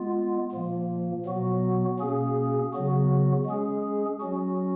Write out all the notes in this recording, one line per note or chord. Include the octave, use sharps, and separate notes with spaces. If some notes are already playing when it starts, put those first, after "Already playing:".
Already playing: G#3 B3 F4
A#2 F3 A#3
B2 F#3 B3 F#4
B2 A#3 C#4 G#4
C#3 F#3 B3 F#4
G#3 C#4 G#4
F#3 C#4 F#4